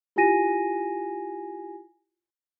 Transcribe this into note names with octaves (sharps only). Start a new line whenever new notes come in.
E4 F4 G4 G#5 A#6 D#7